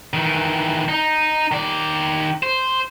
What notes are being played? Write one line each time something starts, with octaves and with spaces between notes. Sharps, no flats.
D#3 E3
D#4
D#3 D5
C5